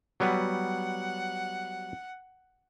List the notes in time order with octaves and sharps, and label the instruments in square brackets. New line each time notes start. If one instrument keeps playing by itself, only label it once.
[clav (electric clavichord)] F#3 G3 B3 [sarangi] F#5